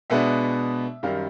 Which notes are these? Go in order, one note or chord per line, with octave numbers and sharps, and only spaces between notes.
B2 G#3 B3 D4 E5
F#2 D#3 G3 F5